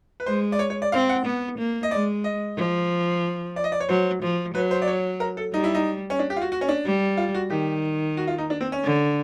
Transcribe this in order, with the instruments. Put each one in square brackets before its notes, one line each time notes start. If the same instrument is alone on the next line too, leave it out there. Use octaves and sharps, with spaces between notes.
[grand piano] B4
[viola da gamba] G#3 [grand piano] C5
[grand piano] D5
C#5
C#5
D5
[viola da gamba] C4 [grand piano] F5
[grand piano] F#5
[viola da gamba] B3
A#3
[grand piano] D#5
[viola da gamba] G#3 [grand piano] D5
[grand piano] D#5
[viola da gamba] F3
[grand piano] D5
D#5
D5
C#5
[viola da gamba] F#3 [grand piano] C5
[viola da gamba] F3
[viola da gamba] F#3 [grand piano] B4
[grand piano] C5
D5
C#5
A#4
A4
[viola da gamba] G3 [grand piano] D#4
[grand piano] E4
D#4
C#4
D4
G4
F4
F#4
F#4
C#4
D4
[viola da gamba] G3
[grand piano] F4
F#4
[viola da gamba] D#3 [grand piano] G4
[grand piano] F#4
F4
D#4
D4
C4
C#4
[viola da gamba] D3